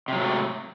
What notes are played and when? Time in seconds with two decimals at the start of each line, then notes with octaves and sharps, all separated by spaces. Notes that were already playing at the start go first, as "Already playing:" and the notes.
0.08 C3
0.12 F#3
0.16 G#2
0.20 A3